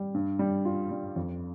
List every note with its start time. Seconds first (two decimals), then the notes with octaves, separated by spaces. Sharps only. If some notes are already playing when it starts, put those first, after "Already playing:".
Already playing: G3
0.14 G2
0.39 G3
0.65 F4
0.91 G3
1.16 F2